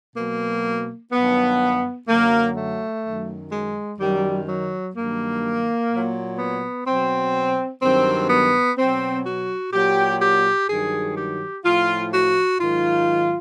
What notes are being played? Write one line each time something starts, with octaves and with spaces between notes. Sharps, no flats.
B2 F#3 A#3
G2 D#3 F#3 B3
F#2 D3 F#3 A#3
A3
F#2 D#3 F#3
G#3
F#2 D#3 F#3 G3
F#3
G2 D#3 F#3 A#3
A#2 F#3
B3
B2 F#3 C4
G2 D#3 F#3 C4
B3
B2 F#3 C4
F#4
A#2 F#3 G4
G4
G2 D#3 F#3 G#4
G4
A2 F3 F4
F#4
G#2 D#3 F#3 F4